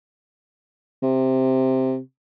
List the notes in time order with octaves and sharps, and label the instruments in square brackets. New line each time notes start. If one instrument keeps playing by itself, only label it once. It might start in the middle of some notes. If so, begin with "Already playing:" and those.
[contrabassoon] C3